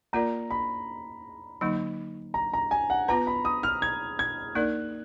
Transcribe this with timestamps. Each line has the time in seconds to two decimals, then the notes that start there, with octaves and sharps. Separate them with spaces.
0.13 A#3 F4 A#4 D5 A#5
0.51 B5
1.61 D3 F#3 A#3 D#4
2.34 A#5
2.54 A#5
2.71 G#5
2.90 F#5
3.08 B3 F4 B4 A#5
3.27 B5
3.45 D#6
3.63 F6
3.82 G#6
4.19 G#6
4.55 A#3 D#4 A#4 D5 F#6